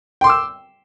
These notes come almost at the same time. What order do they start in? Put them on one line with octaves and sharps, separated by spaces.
G5 C6 D6 E6